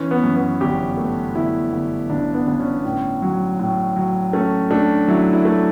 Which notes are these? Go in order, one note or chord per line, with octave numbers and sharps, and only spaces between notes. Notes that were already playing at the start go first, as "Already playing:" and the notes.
Already playing: E3 C#4
B3
F#2
B3
G1 G4
A3
G1 E4
G1
G1 D4
B3
G1
C#4
A2
F#3
A2
F#3
A3 C#4
A3 D4
F#3 E4
E4
A3